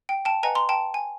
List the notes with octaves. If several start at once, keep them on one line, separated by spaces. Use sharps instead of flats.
G5
G5 A5
B4 D#5 F#5 G#5 A#5
A#5 C6
G5 A5
G#5